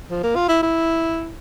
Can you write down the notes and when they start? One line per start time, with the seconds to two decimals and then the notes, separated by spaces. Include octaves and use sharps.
0.11 F3
0.23 A#3
0.35 F4
0.49 E4
0.62 E4